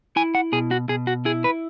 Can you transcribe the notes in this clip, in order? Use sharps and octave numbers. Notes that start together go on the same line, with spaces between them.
E4 G#5
F#5
B2 G#4
F#4
B2 G#4
F#4
E4 G#4
B4